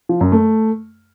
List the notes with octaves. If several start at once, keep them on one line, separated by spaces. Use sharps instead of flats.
F3
F#2
A3